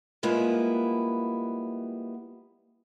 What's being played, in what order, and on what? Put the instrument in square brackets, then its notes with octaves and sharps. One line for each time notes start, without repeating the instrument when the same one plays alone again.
[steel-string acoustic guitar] G3 G#3 A#3 B3 E4 F4